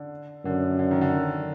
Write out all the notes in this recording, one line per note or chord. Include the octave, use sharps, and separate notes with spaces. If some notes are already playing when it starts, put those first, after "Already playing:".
Already playing: D3
F#2 D3
D3
D#3
D3